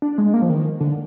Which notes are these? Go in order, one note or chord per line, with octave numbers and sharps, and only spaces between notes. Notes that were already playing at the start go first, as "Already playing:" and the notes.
D4
G#3
A#3
F3
D#3
D3